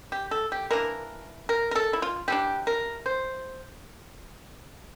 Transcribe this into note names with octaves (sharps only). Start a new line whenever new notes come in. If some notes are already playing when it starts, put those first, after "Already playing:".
G4
A4
G4
E3 A#3 D4 A#4
A#4
A#4
A4
E4
F4
E3 G3 D4 G4
A#4
C5